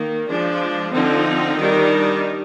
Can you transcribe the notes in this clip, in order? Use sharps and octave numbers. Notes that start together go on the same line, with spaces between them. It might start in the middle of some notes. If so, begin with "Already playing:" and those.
Already playing: D#3 A#3
F3 G#3 D4
D3 F3 C4 D#4
D#3 G3 D4